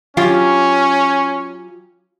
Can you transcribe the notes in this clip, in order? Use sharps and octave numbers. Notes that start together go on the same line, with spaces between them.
F#3 C#4 F4 G4